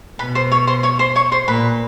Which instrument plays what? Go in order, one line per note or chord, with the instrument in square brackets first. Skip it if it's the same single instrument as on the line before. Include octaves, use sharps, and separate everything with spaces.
[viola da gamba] B2 [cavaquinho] B4 B5
[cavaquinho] C5 C6
C#5 C#6
C5 C6
C#5 C#6
C5 C6
C#5 C#6
C5 C6
[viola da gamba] A#2 [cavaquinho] B4 B5